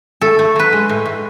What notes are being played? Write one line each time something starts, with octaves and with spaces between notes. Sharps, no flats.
A3 A4
A3
F#3 B4
G#3
A2
A2